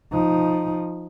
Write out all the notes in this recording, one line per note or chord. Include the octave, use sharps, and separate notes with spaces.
F3 D#4